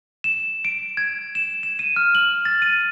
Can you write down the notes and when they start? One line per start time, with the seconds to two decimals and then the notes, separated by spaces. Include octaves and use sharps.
0.24 E7
0.65 D7
0.97 G#6
1.35 E7
1.63 E7
1.79 D#7
1.96 F6
2.15 F#7
2.45 A6
2.62 D#7